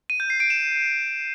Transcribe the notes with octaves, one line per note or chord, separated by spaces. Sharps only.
D#7
G6
C7
D7
E7